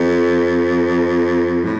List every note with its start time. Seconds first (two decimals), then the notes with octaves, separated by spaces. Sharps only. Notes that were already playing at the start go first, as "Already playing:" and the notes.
Already playing: F2
1.65 A2